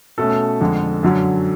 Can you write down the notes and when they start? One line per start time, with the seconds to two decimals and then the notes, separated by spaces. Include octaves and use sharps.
0.18 B2 A3 C#4 A4
0.61 F2 D3 G#3
1.03 F#2 D3 F#3 C#4